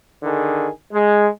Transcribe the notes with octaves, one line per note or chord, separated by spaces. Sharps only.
D3 D#3 G#4
G#3